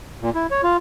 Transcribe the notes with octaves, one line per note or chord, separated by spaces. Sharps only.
A#2
E4
C#5
F4